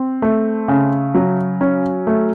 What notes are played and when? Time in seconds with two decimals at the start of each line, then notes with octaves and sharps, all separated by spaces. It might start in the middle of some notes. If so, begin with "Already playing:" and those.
Already playing: C4
0.22 A3
0.68 C#3
1.15 F#3
1.61 C#4
2.07 A3